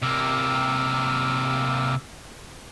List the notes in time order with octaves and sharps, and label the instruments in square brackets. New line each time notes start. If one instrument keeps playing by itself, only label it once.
[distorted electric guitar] C3 A#3 [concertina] D6 E6 F6